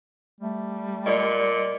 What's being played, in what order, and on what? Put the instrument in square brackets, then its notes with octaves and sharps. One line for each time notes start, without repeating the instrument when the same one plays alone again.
[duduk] G3 [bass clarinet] A3
[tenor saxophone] A#2 [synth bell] D5 D#5